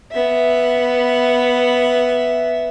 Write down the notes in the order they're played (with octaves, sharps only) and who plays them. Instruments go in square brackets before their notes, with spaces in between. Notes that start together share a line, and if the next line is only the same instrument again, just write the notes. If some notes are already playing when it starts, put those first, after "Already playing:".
[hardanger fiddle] B3 E5